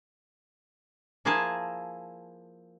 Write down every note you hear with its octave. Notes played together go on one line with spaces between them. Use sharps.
F3 A#3 E4 G#4 G#5 A5